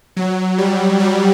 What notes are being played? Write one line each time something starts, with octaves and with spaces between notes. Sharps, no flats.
F#3
G3
G3